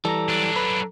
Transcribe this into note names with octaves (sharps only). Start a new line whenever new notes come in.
E3 G3 A4 A#5
F#2 D4
B4